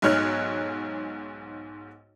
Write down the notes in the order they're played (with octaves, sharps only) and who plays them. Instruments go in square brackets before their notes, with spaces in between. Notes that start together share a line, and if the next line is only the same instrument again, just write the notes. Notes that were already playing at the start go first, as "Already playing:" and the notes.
[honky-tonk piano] B1 G#2 C#5 F6 F#6